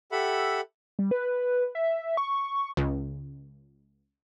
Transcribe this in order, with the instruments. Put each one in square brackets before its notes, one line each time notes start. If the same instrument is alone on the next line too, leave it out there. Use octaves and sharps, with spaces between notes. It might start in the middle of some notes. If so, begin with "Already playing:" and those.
[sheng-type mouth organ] G4 A4 E5 F#5 B5
[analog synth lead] G3
B4
E5
C#6
[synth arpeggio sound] C#2